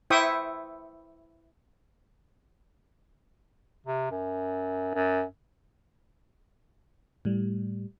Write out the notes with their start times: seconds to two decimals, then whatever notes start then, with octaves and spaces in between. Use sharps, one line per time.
0.10 E4 C5 E5 G5 C#6 D#6
3.87 C3
4.11 F#2
4.94 F#2
7.25 A2 G3